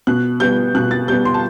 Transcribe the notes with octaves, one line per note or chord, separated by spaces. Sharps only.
B2 F#6
G3 B3 G6
B2 F#6
A6
G3 B3 G6
C6
A5